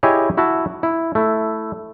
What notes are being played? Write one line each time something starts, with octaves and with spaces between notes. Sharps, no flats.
E4 G4 G#4 C#5 D#5 G#5
E4 F#4 E5 A5
E4
A3 E4